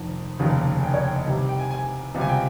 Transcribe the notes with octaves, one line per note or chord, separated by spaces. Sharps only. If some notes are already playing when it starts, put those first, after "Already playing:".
Already playing: F1 F2 D#3
F1 D#2 C#3
G#5
G5
C#5
G5
D#5
C2 C3 D#3 G3 G5
G5
G#5
G#5
C#2 C3 G3
G#5
G5